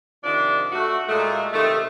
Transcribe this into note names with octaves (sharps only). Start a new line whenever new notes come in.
C3 D#3 F3 D4
A3 F#4
A#2 G#3 A3
C3 D#3 A3